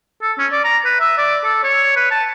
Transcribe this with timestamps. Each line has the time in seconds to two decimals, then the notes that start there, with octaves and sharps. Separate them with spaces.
0.22 A4
0.38 C#4
0.52 D5
0.64 A#5
0.85 B4
1.00 E5
1.18 D5
1.44 A4
1.64 C#5
1.96 B4
2.11 A5